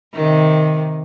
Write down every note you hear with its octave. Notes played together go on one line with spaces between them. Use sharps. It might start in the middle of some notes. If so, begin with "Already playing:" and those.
C3 D#3